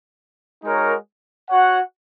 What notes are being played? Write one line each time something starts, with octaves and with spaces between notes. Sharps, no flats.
G#3 D#4 F#4 A#4 C#5
F#4 C#5 F#5